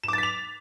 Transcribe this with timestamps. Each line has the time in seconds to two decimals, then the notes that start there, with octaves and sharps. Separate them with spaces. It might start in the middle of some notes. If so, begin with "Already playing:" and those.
0.03 E7
0.08 D6
0.13 A6
0.18 B6
0.23 F7